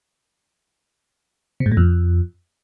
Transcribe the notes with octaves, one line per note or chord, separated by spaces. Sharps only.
C3
G#2
A2
F2